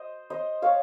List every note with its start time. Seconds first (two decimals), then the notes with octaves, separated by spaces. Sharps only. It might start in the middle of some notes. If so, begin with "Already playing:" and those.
Already playing: C5 D#5
0.30 C5 D#5
0.62 C#5 F5